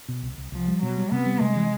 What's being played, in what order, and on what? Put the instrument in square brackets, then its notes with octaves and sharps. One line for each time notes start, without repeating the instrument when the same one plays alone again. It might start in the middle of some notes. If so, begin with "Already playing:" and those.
[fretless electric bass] B2
C2
C2
[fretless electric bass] C2 [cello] F3
[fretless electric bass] G3
[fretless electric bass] B2 [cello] F#3
[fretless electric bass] G3
[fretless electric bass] C3 [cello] B3
[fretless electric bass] G3
[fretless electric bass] C3 [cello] G#3
[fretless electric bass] E3